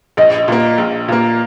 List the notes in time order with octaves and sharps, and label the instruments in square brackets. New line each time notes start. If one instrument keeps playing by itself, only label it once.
[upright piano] A#1 [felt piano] D#5
[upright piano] A#2 A#3
A#1
A#2 A#3